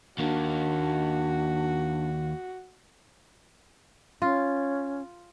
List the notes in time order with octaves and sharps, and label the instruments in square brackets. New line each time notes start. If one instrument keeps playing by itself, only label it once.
[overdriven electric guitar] D#2 A#3 [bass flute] D4 [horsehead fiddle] F#4
[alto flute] C#4 [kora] F4